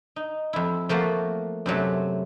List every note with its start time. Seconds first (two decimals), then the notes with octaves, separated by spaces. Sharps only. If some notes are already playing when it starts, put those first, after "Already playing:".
0.16 D#4
0.53 F2 E4
0.89 F3 A3 A#3 F#4
1.66 F#2 C3 F#3 A3